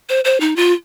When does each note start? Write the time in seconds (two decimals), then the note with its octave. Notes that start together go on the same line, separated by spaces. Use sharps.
0.09 C5
0.25 C5
0.40 D#4
0.56 F4